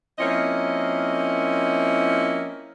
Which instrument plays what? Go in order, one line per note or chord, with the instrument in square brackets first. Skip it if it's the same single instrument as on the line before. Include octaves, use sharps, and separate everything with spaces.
[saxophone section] F3 A#3 C4 C#4 E4 D#5